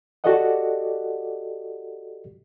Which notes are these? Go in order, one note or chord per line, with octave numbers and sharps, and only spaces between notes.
F#4 G4 A4 D5 D#5 F#5